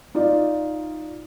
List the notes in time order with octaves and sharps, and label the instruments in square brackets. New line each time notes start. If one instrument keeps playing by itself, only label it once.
[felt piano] D#4 F4 D5